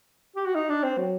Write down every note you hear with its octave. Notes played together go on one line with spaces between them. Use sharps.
G4
F#4
D#4
D4
C4
F#3